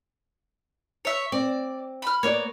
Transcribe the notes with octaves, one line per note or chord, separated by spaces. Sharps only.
C#5 E5
C4 D5
B5 F6
A#3 B3 C#5 D5